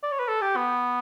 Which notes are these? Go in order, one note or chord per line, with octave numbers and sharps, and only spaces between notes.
D5
C#5
B4
A4
G4
B3